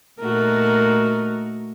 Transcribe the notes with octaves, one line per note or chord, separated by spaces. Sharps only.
A#2 A3 D#4 F#4 A#4